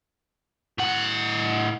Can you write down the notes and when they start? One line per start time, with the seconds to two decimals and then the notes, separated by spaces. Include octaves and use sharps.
0.78 A2 F#5